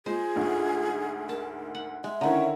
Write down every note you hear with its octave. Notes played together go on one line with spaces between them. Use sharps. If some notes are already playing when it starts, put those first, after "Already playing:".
G#3 F4 G#4 C5
D2 G#2
A#4 A5
F#5
G#3 E5
D3 D#3 C#4 E4 A#5